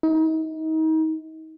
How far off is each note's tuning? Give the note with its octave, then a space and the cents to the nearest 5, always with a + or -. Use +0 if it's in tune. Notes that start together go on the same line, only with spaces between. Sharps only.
D#4 +35